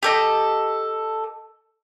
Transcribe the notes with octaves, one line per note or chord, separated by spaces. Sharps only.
G4 A4 D#5